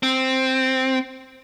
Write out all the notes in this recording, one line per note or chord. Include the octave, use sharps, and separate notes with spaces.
C4